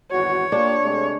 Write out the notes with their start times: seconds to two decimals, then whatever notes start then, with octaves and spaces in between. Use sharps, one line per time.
0.11 G#1 E2 F#4 C#5
0.52 A#3 D4 F4 G4
0.83 C3 G#3 A3